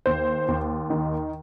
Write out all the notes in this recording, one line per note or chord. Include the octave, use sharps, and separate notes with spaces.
D#2 C5
D#2
D#3